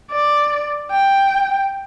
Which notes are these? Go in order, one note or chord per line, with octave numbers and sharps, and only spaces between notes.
D5
G5